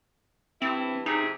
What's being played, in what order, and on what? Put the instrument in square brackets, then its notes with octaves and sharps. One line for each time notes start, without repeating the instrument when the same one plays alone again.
[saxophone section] G2 E3 E4 [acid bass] C4
[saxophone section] F2 C3 G#4 [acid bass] D#4